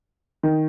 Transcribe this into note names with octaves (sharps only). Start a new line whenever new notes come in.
D#3